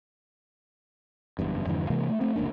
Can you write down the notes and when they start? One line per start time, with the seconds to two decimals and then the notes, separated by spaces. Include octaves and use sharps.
1.39 F#1 E2 G2
1.66 F2 G#2 D3 E3
1.90 C3 E3 G#3 A#3
2.09 A3
2.21 A3 C4
2.36 F1 C#2 A#3 D4